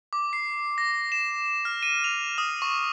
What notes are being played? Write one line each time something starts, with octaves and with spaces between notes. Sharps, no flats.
D6
C7
A#6
E7
F6
D#7
F7
D#6
C#6